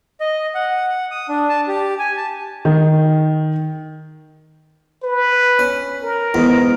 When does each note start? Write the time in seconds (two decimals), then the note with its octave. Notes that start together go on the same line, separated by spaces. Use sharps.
0.20 D#5
0.55 F#5
1.11 D#6
1.29 D4
1.49 A5
1.68 G4
1.99 G#5
2.17 A5
2.65 D#3
5.03 B4
5.59 C#4
6.03 A#4
6.34 E2 G#2